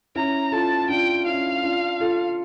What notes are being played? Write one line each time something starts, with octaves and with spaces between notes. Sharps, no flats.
C#4 E4 A#5
F4 A4 A5
D4 F4 G5
C#4 E4 F5
D4 F4
F4 A4